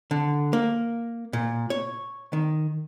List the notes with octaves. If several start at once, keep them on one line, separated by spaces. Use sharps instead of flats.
D3
A#3
A#2
C#5
D#3